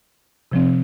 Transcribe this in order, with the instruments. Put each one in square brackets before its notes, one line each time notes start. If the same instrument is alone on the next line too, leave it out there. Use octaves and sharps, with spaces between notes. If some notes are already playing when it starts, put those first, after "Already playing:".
[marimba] C3 F3 C4